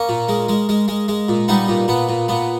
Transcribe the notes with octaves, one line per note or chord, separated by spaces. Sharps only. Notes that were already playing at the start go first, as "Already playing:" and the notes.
Already playing: A#3 C#4
A#2
G#3
G#3
G#3
G#3
G#3
A#2
G3 B3 D#4
A#2
A#2 B3
A#2
A#2 B3